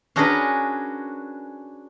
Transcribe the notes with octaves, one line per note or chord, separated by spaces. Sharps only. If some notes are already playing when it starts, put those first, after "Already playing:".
C#4 D4 F#4 G#4 A#4 B4